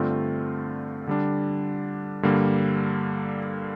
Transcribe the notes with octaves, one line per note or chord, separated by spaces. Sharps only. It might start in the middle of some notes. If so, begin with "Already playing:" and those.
Already playing: G2 D3 A3 C4 F4
D3 G3 D4
G2 D3 G3 A#3